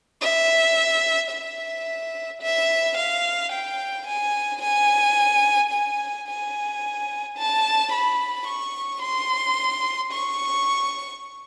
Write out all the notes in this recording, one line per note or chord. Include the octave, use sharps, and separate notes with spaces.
E5
E5
E5
F5
G5
G#5
G#5
G#5
G#5
A5
B5
C#6
C6
C#6